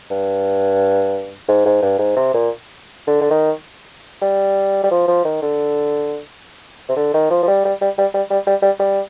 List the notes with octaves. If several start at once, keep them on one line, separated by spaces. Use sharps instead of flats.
G2
G#2
G#2
G2
G#2
C3
A#2
D3
D3
D#3
G3
G3
F3
F3
D#3
D3
C3
D3
D#3
F3
F3
G3
G3
G3
G3
G3
G3
G3
G3
G3